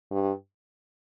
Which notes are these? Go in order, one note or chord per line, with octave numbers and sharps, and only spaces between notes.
G2